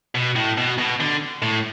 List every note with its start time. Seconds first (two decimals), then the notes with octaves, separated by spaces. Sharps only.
0.15 B2
0.36 A2
0.57 B2
0.78 B2
1.00 D3
1.42 A2